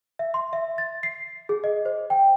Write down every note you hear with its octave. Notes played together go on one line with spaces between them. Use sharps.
E5
C6
E5
A6
C7
G#4
D#5
C5
G5